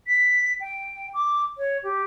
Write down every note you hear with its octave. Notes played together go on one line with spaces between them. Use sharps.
B6
G5
D6
C#5
G4